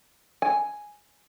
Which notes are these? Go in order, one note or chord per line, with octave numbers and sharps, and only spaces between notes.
G#5